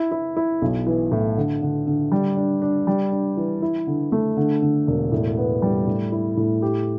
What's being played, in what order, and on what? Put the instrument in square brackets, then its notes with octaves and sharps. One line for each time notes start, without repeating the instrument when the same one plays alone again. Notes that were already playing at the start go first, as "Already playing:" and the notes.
Already playing: [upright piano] E4
E4
E4
B1
E3
A2
D3
D3
D3
G3
D4
D4
G3
D4
E3
E4
D3
A3
D3
D3
E1
A2
B3
G3
A2
E4
A2
G4